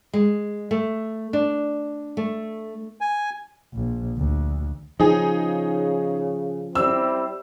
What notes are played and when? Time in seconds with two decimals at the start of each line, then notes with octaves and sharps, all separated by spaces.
0.13 G#3
0.71 A3
1.33 D4
2.17 A3
3.01 G#5
3.74 A#1
4.17 D2
4.99 C#3 F3 D#4 G#4
6.75 G3 C4 E4 E6